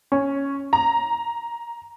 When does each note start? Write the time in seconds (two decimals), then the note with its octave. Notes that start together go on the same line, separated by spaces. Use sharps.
0.12 C#4
0.73 A#5